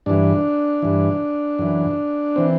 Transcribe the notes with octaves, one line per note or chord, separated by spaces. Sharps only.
G2 E3 D4
G2 E3
F#2 E3
E3 C4